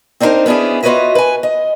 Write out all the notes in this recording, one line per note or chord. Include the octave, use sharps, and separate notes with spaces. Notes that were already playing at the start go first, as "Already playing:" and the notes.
C4 D4 D#4 F#4 A#4 C5
B3 C#4 D4 E4 G#4
F4 F#4 B4 C#5 D#5 E5
B4 G#5
D#5